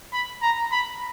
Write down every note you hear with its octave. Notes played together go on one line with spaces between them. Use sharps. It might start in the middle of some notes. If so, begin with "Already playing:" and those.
B5
A#5
B5